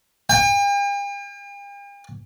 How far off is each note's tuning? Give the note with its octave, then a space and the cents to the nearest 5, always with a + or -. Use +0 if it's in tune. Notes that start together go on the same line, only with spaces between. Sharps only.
G5 +45